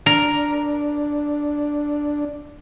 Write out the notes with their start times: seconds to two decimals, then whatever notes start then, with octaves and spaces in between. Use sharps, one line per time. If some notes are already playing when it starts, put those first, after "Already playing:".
0.06 D4 A#4